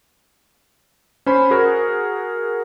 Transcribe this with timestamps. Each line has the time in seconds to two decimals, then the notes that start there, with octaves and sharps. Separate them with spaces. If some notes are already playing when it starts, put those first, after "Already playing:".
1.26 C#4 C5 B5
1.51 F#4 G#4 A#4